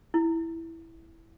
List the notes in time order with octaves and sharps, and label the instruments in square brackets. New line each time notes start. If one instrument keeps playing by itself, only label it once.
[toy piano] E4